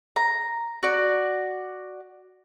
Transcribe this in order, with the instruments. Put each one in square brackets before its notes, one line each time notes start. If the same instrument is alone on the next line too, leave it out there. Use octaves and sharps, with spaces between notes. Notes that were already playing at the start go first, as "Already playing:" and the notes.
[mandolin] A#5
F#4 D5